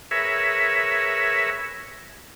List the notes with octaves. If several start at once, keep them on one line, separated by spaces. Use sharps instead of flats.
G#4 A#4 B4 C#5 E5